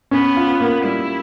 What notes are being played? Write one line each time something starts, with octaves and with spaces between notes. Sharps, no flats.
B3 C#4
F4
A#3
G3 E4